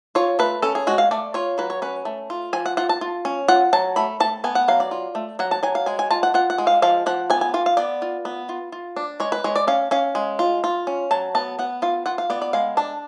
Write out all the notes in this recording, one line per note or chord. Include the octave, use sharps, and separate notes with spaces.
F4 C#5
A3 B4
C#4 A4
G#4
G#3 F#4
F5
A3 D5
F4 C#5
F#3 B4
C#5
C#4 B4
A3
F4
F3 G#5
F#5
F4 F#5
A5
F4
C#4
F4 F#5
F#3 A5
A3 B5
A3 A5
B3 G#5
F#5
F#3 F5
D5
F4
A3
F#3 F#5
A5
F#3 G#5
F5
G#3 G#5
G#5
F4 A5
F#5
F4 F#5
F#5
G#3
F5
F3 F5
F3 F#5
B3 G#5
G#5
F4 F5
F5
B3 D5
F4
B3
F4
F4
D4
G#3 C#5
B4
G#3 C#5
D5
C#4 F5
C#4 F5
G#3
F4
F4
C#4
F#3 A5
B3 A5
B3 F#5
F4 F5
F4 F#5
F5
B3 D5
D5
G#3 F5
D4 A5